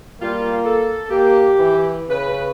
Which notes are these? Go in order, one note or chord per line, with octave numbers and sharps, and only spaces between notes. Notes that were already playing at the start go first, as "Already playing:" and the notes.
G3 A#3 F4
A4
A#3 G4
E3
C#3 B4